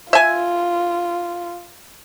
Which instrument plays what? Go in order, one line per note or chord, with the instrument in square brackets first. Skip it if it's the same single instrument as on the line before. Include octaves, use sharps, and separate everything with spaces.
[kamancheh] F4 [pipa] E5 G#5